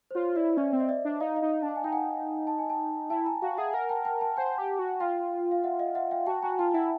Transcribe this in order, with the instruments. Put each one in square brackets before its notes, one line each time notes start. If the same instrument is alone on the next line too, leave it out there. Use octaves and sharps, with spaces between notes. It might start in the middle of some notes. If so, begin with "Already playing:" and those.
[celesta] C5
[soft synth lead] F4 [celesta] C#5
[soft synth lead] E4 [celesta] D5 E5
[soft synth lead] C#4 [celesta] D5 E5
[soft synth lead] C4
[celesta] D#5
D5 E5
[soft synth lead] D4
[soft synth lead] D#4 [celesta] D#5 F5
[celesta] D#5 F5
[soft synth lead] D#4
D4
[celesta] A5
G#5
[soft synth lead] D#4 [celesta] G5
[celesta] F#5 G#5
A5
G#5
G5 A5
[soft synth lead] E4 [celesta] G5 A5
[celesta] G#5 A#5
[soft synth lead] F#4 [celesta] F5 G5
[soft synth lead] G#4 [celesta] E5 F#5
[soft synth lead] A#4 [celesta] F#5 G#5
[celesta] G5 A5
G5 A5
G5 A5
[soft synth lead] C5 [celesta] F#5 G#5
[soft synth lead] G4
F#4
[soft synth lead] F4 [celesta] F5 G5
[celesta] F5
E5 F#5
D#5 F5
E5 F#5
F5 G5
[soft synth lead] F#4 [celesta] G5 A5
[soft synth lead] F#4 [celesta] G#5 A#5
[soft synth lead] F4 [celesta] G5 A5
[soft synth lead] E4 [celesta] E5 F#5